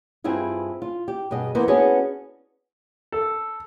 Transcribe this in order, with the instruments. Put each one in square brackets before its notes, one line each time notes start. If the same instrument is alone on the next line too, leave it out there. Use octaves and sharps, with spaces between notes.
[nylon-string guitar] G2 C4 E4 F4 G#4
F4
G4
G2 B2 G#4 D#5
E3 A#3 B3 E4 B4 C5
B3 C#4 D4 F#4 G#4
[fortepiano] A4